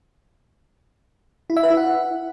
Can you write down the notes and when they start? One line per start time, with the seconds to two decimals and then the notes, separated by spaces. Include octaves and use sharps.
1.50 E4
1.57 E5
1.63 B4
1.70 E4
1.77 F#5